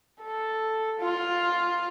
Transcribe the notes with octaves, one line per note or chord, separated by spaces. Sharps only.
A4
F4